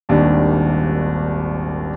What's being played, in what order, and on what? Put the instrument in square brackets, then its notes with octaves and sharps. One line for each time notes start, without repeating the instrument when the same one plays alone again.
[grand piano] D#1 G#1 D#2 D4